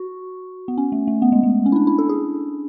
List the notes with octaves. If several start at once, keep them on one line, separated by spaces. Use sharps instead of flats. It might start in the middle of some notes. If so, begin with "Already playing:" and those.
Already playing: F#4
B3
C#4
A3
A3
B3
G#3
G#3
C#4
E4
D4
E4
A4
G#4